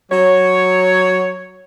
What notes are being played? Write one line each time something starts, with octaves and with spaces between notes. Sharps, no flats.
F#3 C#5